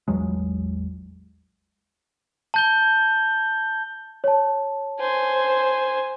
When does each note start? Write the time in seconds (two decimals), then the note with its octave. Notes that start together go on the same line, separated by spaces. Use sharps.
0.08 A1 E2 F#3 G#3
2.54 A5 G6 G7
4.24 C#5 A5
5.00 C5 G#5